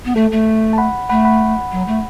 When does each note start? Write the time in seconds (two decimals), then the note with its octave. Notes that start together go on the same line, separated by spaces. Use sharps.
0.05 B3
0.15 A3 A4
0.32 A3
0.73 A5
0.78 F#5 B5
1.09 A3 F#5 B5
1.25 F#5 B5
1.72 F#3
1.87 A3